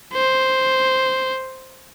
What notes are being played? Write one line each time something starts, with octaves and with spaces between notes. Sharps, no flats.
C5